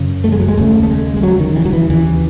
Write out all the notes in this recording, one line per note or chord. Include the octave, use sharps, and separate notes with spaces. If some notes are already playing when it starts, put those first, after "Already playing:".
Already playing: F#2 C#3
A3
G#3
F#3
G#3
D#2 C#3 A3
A3
G#3
G#3
F#3
D#3
E3
F#3
E3
D#2 C#3 E3